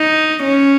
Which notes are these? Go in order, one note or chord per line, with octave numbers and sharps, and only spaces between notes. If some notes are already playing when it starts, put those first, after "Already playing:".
Already playing: D#4
C#4